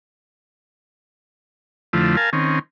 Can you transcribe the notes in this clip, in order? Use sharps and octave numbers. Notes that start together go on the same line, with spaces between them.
F2 D3 F3 A3 E4
A#4 F5 G#5 A5
D#3 C4 C#4